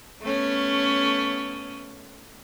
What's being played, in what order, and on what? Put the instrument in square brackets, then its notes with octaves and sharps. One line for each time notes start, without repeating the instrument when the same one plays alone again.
[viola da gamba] A3 B3 C#4